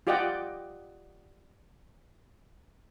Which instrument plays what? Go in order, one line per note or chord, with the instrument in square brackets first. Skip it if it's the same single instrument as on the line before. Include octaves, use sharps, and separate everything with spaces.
[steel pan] F4 G4 D5 D#5 F#5 G5